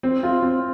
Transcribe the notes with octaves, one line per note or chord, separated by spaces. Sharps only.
C4
F4
C4